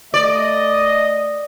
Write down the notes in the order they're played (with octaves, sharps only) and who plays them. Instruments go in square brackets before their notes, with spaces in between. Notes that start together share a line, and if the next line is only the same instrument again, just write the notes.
[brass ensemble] A3 D#5 [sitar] D5